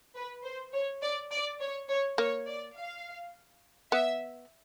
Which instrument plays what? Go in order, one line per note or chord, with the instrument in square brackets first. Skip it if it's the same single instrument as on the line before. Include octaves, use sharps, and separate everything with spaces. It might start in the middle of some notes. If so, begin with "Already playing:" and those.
[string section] B4
C5
C#5
D5
D5
C#5
C#5
[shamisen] A#3 [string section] C#5
[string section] D5
F5
[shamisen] B3 [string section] E5